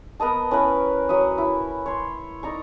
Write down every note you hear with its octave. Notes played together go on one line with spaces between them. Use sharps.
B3 A#4 D#5 A5
C#4 E4 A#4 B4
F#3 E5 D#6
E4
C#5 C6
D#4 D5 A#5 C#6